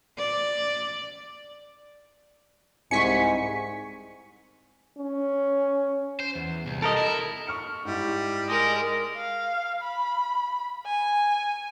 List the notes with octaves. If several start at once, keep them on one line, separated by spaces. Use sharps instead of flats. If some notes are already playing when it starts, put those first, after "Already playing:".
D5
C2 G#2 G#5 C#6 B6 C#7
C#4
C5
E2
C2
G4 A4 A#4 D#5
E4
C#6 F6 C#7
G#2 G3 E4
G#3 A#4 D#5
F5
B5
G#5